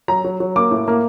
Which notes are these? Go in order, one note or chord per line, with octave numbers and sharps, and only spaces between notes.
F#3 A#5
F#3
F#3
A#3 D6
A2
A#3